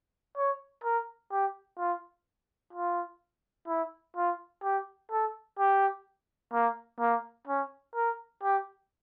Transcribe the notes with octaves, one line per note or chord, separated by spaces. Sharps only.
C#5
A#4
G4
F4
F4
E4
F4
G4
A4
G4
A#3
A#3
C#4
A#4
G4